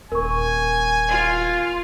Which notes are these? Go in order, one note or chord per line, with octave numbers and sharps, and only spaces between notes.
D#1 A#4 G#5 C#6
F4